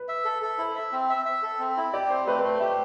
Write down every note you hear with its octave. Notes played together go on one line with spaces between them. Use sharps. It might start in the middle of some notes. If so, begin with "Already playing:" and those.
Already playing: B4
E5
A4
A4
E4 C5
E5
C4
E5
E5
A4
C4
E4
G4 D5
C4 C5
A3 B4
B4
A3 C5
G4 E5